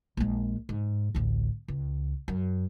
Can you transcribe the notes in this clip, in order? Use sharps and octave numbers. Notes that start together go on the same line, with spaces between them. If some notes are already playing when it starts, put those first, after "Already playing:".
A#1 G#3
G#2
A1 D2
C#2
F#2